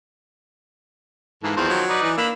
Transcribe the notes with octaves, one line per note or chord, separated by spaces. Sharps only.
G#2 E3 A#3 A4
E2 D#3 F3 C4
F#3
D#4 B4 D5
E3
A#3 D4 B5 E6